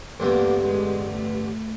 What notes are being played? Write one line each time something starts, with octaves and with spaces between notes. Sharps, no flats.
A1 G2 D3 G3 A#3 B3
G#3
A3